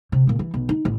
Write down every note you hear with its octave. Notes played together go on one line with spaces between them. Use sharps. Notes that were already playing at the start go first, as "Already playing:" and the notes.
C3
C#2 A#2
E3
B1
D#4
A1